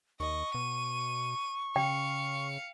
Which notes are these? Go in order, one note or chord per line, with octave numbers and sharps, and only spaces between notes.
D#2 D#5 C#6
B2 D#7
C#3 F5 G5 C#7